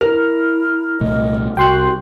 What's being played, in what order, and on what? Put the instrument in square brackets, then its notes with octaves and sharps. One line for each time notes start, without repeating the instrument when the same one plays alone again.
[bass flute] E4 [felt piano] A#4 [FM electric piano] F6
[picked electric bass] C2 A#2 A3 [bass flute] D#5
[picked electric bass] C2 [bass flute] F#4 [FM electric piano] G5 C6 F#6